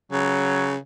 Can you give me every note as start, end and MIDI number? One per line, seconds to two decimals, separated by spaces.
0.12 0.77 49
0.12 0.71 54